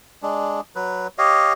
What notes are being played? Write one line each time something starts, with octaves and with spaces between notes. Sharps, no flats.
G#3 D4
F#3 B4
G4 C#5 D#5 F5